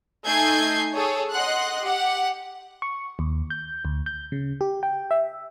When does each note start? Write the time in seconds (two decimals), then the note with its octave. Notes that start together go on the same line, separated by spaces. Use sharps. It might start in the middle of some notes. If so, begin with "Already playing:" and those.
0.25 A3 D#4 G#5 G6 G#6 C7
0.95 G#4 A4 C#5
1.32 D#5 F#5 C6 F#6
1.81 G4 F#5
2.82 C#6
3.19 D#2
3.50 G6
3.85 D2
4.06 G6
4.32 C#3
4.61 G4
4.83 G5
5.11 E5